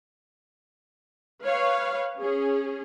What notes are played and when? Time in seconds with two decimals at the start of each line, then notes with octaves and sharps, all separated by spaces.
1.43 B4 C#5 F5
2.18 C#4 G#4